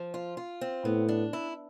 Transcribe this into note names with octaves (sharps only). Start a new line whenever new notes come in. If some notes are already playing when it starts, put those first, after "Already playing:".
Already playing: F3
F4
F4
C4
A2 B3
D4
E4